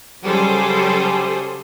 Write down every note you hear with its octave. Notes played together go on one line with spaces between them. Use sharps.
C#3 F#3 G3 G#4 A4 C5